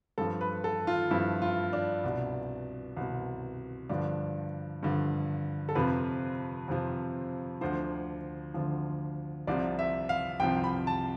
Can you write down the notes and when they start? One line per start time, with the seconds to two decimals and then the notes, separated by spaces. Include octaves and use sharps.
0.18 G2 F3 A4
0.41 B4
0.64 A4
0.87 F4
1.11 G2 F3 E4
1.42 F4
1.73 D4
2.04 C2 B2
2.96 C2 B2
3.89 G2 D3 F3 D4
4.83 G2 D3 F3
5.69 A4
5.75 F2 C3 F3 B4
6.68 F2 C3 F3
7.61 D2 D3 F3 C5
8.54 D2 D3 F3
9.47 C2 C3 F3 D5
9.79 E5
10.09 F5
10.39 C2 C3 F3 G5
10.64 B5
10.87 A5